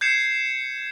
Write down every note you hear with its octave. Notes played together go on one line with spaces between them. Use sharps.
G6 G#6 C7 C#7 E7